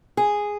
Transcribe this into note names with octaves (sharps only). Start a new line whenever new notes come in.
G#4